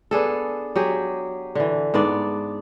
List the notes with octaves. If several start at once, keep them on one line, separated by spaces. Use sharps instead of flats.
B3 D4 G#4 A4
F#3 G4 G#4
D3 E3
G#2 B3 D4 D5